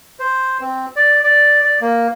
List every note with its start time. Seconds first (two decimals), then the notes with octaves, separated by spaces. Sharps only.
0.20 C5
0.61 C4
0.96 D5
1.24 D5
1.62 D5
1.81 A#3